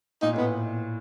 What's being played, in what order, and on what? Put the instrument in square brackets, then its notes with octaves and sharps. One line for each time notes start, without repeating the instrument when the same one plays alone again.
[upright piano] A#2 [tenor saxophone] D#4
[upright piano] A2 [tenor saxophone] B3